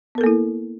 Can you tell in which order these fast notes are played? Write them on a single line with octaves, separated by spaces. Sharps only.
B3 A#4 A4 A#3 E4